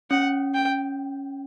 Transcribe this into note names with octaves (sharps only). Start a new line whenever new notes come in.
C#4 F#5
G5